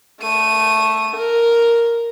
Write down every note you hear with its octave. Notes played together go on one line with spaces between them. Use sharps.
A3 D#7
A#4